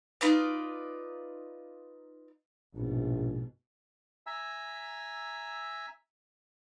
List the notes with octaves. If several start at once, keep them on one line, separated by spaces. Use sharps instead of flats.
D#4 F4 B4 D5
A#1 G#2 B2
E5 G#5 A#5 E6